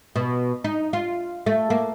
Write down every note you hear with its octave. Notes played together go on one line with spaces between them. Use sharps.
B2
D#4
F4
A3
A#3